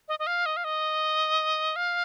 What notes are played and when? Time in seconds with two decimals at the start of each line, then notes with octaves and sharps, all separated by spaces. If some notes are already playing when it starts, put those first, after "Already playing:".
0.08 D#5
0.19 D#5
0.27 F5
0.46 D#5
0.57 F5
0.64 D#5
1.76 F5